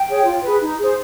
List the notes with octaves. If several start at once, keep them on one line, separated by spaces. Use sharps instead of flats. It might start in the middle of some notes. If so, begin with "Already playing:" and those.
Already playing: G5
G#4 C#5
F4
G#4 B4
D#4
G#4 C5